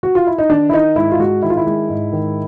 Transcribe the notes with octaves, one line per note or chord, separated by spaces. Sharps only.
F#4
F4
E4
D#4
D#3 D4
E4
D#3 D#4
G#2 E4
F4
G#3 F#4
D#3 E4
F4
E4
G#3
G#2
D#3